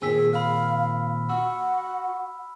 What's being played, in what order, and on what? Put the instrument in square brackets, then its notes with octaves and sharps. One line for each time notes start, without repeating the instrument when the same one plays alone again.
[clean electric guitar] A#2 D#3 C4 [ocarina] G#4 [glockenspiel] G#5 E6 B6
[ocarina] F5 [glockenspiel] B5 F6
[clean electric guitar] F#4 [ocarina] F#5 [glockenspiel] E6